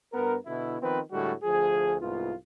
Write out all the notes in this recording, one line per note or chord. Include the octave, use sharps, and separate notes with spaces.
G2 B3 A#4
B2 D3 E4
D#3 F3 B3 C4 B4
A2 D3 G3 G#3 F#4
D2 F3 G#4
C2 G#2 B3 F4